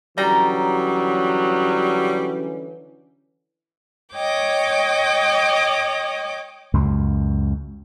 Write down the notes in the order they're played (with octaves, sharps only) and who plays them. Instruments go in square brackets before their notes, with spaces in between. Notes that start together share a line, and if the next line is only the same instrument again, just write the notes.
[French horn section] D3 E3 C#4 [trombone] F#3 [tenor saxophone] G3 [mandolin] A#5
[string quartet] C#5 D#5 G5 D6
[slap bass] C#2 F#2